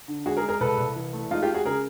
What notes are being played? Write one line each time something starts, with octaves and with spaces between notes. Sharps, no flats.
D3
G#3 F#4 G#4
G#4 A#4
G#3
G#4 A#4
C2 A4 B4
C2
E3
A3
G#3 D#4 F4
F4 G4
G#3
F#4 G#4
C#3 G#4 A#4